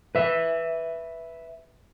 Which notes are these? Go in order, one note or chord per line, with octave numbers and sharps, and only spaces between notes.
B4 E5